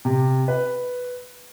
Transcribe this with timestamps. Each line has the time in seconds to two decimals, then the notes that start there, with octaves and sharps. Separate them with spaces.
0.05 C3
0.48 B4